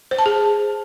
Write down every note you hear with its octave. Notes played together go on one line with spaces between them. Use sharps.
C5
A5
G#4